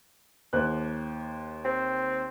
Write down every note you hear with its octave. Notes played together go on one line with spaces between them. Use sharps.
D#2 C5 F#6
C4